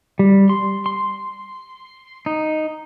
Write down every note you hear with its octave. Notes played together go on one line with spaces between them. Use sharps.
G3
C6
C6
D#4